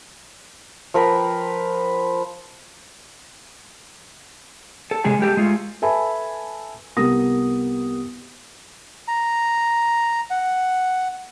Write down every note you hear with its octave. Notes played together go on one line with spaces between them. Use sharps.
F3 A#4 B4 G5
A4
C3 G#3 G#4 A4 G#5
G3 G#3 G4 A4
G#3 A3 F4
A4 B4 E5 G#5 A5 B5
C2 B3 G4 A#4 D#6 A#6
A#5
F#5